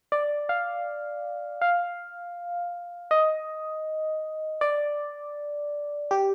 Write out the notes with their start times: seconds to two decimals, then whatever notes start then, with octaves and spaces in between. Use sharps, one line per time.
0.12 D5
0.49 F5
1.62 F5
3.11 D#5
4.61 D5
6.11 G4